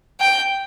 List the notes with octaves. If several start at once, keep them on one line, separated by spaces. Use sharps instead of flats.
G5